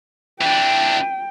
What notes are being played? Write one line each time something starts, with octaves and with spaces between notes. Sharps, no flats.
E3 D4 G5